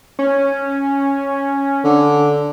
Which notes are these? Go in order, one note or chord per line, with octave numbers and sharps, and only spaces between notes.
C#4
D3